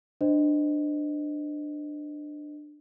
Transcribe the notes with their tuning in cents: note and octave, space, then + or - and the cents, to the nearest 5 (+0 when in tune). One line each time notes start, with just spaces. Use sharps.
D4 +15 C5 -15 D#5 +0